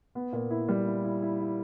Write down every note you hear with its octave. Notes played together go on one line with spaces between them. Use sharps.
B3
A#2
E4
G3
E4
E4
E4
E4